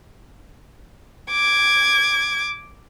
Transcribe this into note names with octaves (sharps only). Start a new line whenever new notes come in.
D6 G#6